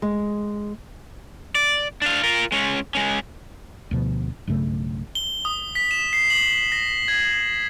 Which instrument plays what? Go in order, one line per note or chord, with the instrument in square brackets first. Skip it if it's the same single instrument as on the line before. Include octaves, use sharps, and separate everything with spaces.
[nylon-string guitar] G#3
[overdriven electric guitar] D5
D4 F5
F4 A#4
G#3 C#4
G#3 C#4
[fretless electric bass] D2 B2 F3
B1 G2 C#3 A3
[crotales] G7
D#6
B6
E7
C7
F#7
A#6
G#6